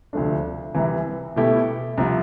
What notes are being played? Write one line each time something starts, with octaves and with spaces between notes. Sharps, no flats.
D2 C3 F3 A3 D4
C2 C3 E3
B2 A3 E4 G4
C2 C3 F3